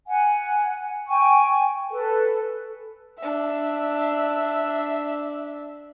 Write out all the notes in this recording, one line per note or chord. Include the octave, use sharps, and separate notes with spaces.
F#5 G#5
G5 G#5 C#6
A4 B4
D4 E5